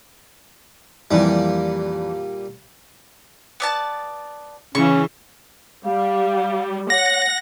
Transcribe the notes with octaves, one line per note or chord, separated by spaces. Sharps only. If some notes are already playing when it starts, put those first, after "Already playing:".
F2 A#2 E3 G3
B3 D5 A5
C#3 E3 C#4 C#6
G3 F5
C#5 F#5 A#6